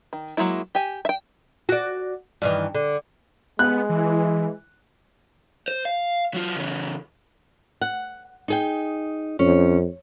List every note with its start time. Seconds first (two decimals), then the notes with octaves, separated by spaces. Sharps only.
0.13 D#3
0.37 F#3 G#3 A#3 E4
0.75 G4 G#5
1.05 E5 G5
1.69 F#4 D5
2.42 G2 D#3 E3
2.75 D3
3.59 G#3 B3 F#6
3.89 E3
5.68 C5
5.85 F5
6.34 F#3 F4
6.56 C#3 E3
7.81 F#5
8.48 D#4 G#4 G5
9.39 F2 C#4